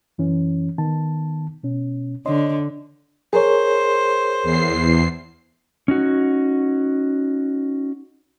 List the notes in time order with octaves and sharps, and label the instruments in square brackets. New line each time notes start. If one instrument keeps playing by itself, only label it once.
[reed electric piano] F#2 E3 C#4
D#3 B3 A5
B2 C#4
[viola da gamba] D3 [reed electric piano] C#5 D#5 C6
[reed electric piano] G#4 A#4 C#5 [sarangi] C5
[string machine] E2 C7
[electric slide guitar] C#4 D#4 F#4